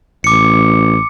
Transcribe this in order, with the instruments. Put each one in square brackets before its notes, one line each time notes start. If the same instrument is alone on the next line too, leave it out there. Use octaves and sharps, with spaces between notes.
[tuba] A1 [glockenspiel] D6 C#7